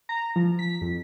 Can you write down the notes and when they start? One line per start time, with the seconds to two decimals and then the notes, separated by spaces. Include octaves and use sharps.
0.09 A#5
0.36 F3
0.59 B6
0.81 F2